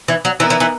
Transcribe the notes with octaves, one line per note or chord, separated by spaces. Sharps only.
E3
F#3
E3 B3 D#4 A#4
E3
E3